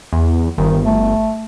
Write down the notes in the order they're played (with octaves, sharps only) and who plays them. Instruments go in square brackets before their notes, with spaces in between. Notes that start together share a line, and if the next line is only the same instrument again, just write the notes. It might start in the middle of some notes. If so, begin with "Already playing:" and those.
[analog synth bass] E2
[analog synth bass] G1 [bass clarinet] D#3
[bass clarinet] A3